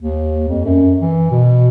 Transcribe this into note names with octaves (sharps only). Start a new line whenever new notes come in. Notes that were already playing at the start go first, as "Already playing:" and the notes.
D#2
F2
F#2
E3
B2